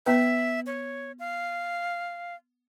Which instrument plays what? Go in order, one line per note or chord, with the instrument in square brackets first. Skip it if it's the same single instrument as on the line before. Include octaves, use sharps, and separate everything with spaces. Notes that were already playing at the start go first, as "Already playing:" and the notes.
[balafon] B3 B4 [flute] E5
[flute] C#5
F5